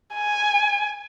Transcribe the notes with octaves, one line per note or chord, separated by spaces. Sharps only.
G#5